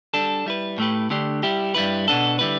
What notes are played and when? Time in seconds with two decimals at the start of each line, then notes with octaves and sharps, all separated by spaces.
0.14 G3 D4 A4
0.46 G3 E4 B4
0.78 A2 A3 G4 B4
1.10 D3 A3 D4 G4
1.43 G3 E4 G4
1.75 G2 G3 E4 B4
2.08 B2 B3 D4 A4
2.39 D3 G3 E4 B4